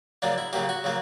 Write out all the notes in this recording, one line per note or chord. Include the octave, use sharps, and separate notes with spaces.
C#3 F#3 A#3 D4
E4
C#3 F#3 A#3 G4
F#4
C#3 F#3 A#3